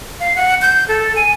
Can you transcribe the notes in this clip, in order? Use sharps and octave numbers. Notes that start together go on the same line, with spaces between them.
F5
F#5
G6
A4
G#5